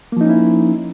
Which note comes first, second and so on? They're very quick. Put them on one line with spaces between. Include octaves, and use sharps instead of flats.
A#3 F3 D#4 C#4 E4